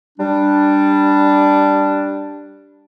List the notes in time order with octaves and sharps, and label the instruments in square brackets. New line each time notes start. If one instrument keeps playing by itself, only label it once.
[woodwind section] G3 D4